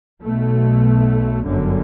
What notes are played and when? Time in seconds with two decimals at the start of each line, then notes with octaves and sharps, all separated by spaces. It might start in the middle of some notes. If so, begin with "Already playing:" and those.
0.22 B1 B2 A3
1.45 G1 F#2 D3